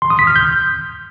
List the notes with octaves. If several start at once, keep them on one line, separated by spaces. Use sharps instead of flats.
C6
D#6
B6
F6
G6